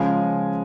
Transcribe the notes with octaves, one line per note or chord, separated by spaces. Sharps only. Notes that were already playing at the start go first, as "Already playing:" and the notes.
Already playing: C#3 F3 G#3 F5 G#5